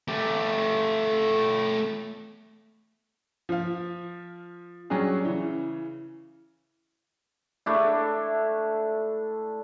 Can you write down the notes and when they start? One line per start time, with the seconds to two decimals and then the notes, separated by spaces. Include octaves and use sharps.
0.08 A3 G4
3.49 F3 F5
4.90 F#3 G3 C#4 D4 G#4
5.25 C#3 E3
7.66 A3 D4 E4